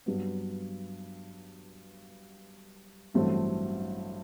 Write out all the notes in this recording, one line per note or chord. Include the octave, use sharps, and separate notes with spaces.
G2 F#3 B3
A1 G2 F#3 A3 C4